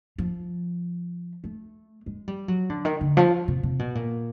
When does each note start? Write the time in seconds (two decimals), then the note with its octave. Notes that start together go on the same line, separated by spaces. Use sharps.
0.18 F3
1.44 A3
2.06 G#3
2.28 G3
2.48 F#3
2.70 D3
2.85 D#3
3.01 D3
3.17 F3
3.48 C3
3.63 C3
3.79 B2
3.95 A#2